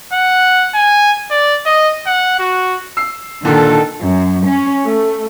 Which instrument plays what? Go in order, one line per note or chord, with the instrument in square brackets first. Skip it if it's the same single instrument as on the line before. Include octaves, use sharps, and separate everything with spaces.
[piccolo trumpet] F#5
G#5
D5
D#5
F#5
F#4
[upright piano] E6 C7
[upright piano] A#2 D3 [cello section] D#3 A4
[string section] F#2
C#4
A3